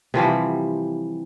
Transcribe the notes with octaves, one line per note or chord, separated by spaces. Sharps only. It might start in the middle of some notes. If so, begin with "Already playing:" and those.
C3 E3 F3 G3